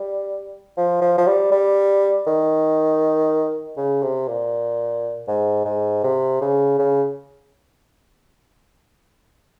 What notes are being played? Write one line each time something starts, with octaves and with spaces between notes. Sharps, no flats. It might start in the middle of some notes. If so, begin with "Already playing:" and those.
Already playing: G3
F3
F3
F3
G3
G3
D#3
C#3
C3
A#2
G#2
G#2
C3
C#3
C#3